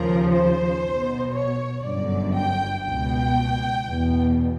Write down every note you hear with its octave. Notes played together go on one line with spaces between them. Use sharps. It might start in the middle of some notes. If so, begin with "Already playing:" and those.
Already playing: D#2 C#3 F3 A#4
C5
B1 B2
C#5
G1 F#2 D3 D5
G5
C#2 B2 G5
E2 B2